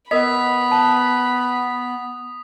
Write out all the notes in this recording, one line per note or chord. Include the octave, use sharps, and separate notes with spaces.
B3 A#4 D#5 B5 D#6 B6
A5